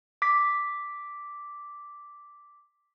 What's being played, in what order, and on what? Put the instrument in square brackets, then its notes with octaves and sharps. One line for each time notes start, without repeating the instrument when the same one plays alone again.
[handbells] D6 B6